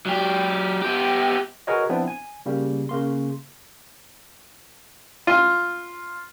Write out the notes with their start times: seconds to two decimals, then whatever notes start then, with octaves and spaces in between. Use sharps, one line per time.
0.06 F#3 G4
0.82 B3 G4
1.67 F#4 G#4 A#4 B4 C#5 D#5
1.89 F3 B3 C4 D4 E4
2.08 G#5
2.46 C#3 G3 A#3
2.89 C#3 A#3 C6
5.27 F4